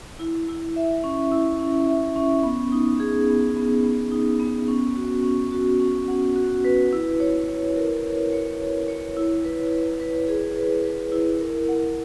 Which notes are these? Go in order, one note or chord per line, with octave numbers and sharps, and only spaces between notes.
E4
E4
E5
C#4
E4
C#4
E5
C#4
B3
D#4
G#4
B3
B3
B3
D#4
B3
C#4
F#4
C#4
F#4
C#4
F#5
F#4
B4
E4
C#5
C#5
A#4
C#5
C#5
C#5
C#5
E4
B4
B4
B4
G#4
B4
B4
E4
A#4
F#5